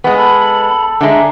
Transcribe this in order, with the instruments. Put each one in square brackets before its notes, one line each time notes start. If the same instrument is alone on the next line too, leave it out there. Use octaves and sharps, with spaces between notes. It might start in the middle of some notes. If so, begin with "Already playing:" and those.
[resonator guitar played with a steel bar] G#3 B3 [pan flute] G#5 [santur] C#6
[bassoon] A4 [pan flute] B5
[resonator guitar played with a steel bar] D3 G#3 [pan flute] E5 [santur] A5 A#5